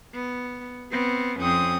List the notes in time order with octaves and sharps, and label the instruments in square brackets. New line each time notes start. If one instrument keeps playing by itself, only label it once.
[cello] B3
B3 C4
[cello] F2 C#4 [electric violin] C4 D#6